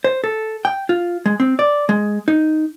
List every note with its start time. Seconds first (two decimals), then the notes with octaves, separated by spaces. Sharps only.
0.04 C5
0.24 A4
0.65 G5
0.89 F4
1.26 G#3
1.40 C4
1.59 D5
1.89 G#3
2.28 D#4